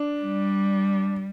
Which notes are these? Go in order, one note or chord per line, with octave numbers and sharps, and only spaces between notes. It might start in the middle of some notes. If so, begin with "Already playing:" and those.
Already playing: D4
G3